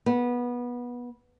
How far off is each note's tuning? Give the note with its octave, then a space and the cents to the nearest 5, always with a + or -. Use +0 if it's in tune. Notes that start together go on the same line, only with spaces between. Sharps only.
B3 -20